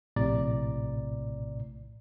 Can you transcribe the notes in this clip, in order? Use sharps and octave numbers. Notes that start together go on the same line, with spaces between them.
A#1 A2 C3 D5 A#5